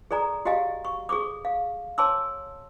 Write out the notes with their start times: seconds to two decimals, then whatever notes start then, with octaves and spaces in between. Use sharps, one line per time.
0.11 G#4 A4 D5 G#5 A#5
0.45 F#4 G4 D#5 F5 G#5
0.85 C#6
1.09 G#4 A4 C#6 D6
1.45 F5
1.98 C#5 G#5 A5 C6 D6 E6